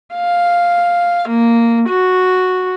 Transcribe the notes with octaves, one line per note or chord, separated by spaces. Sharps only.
F5
A#3
F#4